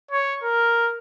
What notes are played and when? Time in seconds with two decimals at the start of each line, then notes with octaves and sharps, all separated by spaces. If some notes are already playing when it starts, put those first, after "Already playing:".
0.11 C#5
0.43 A#4